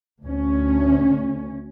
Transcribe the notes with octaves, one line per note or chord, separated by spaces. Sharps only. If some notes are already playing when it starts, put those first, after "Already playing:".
D2 C#4